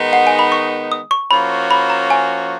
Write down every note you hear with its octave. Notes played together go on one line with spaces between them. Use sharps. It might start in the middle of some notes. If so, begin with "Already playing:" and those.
Already playing: D#3 G#3 B3 D#4
F#5
G#5
B5
C#6
D#6
C#6
F3 A#3 C#4 F#4 B5
B5
A#5
G#5